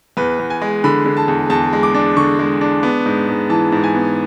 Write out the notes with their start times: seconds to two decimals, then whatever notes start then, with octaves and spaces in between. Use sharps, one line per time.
0.17 E2 B4
0.39 E2
0.50 G#5
0.62 G#3
0.84 D3 B5
1.06 D3
1.17 A5
1.28 E2
1.50 E2 A5
1.73 G#3
1.83 D6
1.94 D4
2.17 D3 C#6
2.39 G#3
2.61 D4
2.83 B3
3.06 G#2
3.29 G#2
3.50 E3 A5
3.72 G#2
3.84 G#5
3.95 B3